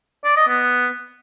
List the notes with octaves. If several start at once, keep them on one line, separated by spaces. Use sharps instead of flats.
D5
D#5
B3